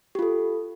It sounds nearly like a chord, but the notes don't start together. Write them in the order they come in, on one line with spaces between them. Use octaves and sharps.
G4 F4 A4